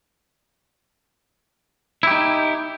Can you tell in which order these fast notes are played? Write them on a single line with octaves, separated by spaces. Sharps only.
E4 G4 D#4